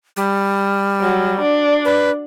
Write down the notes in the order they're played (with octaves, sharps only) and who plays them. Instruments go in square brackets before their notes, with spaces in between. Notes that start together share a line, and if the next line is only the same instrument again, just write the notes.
[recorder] G3
[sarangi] F#3
D4
[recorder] B4